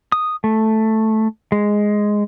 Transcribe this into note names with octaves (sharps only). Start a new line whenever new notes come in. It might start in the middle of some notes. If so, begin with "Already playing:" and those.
D#6
A3
G#3